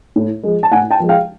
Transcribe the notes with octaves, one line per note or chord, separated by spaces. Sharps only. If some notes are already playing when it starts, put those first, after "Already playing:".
A2
F3 G#3
A5
A2 F#5 G#5
G5 A5
F3 G#3
F5 G5